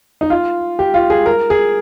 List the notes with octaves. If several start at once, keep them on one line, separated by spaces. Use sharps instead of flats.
D#4
F4
G4
F4
G#4
A#4
G#4